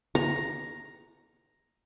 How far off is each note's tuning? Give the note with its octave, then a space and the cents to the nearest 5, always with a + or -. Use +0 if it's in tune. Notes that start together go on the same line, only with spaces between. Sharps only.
A#5 +5